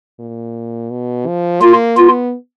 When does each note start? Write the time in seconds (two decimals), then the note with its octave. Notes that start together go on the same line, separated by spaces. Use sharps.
0.19 A#2
0.91 B2
1.27 F3
1.61 A#3 F4
1.97 B3 F4